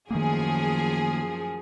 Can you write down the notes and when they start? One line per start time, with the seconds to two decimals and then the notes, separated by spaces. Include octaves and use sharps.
0.11 F#2 D#3 F3 A3 A#3 G#4